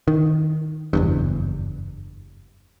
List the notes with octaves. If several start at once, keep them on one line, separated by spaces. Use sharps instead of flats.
D#3
F#1 E2 G2